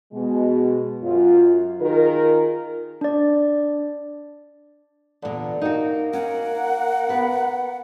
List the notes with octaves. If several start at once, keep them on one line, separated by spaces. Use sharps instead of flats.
B2 G#3
F#2 F4
D#3 F4 G#4 A#4
D4 D5
E2 A#2 D3
A#3 D#4 F#4
C#4 F#5
B3 B4